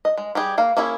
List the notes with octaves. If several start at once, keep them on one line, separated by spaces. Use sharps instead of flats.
D#5
G#3
G3 G4 G#4
A#3 F5
A#3 C#4 E4 G#4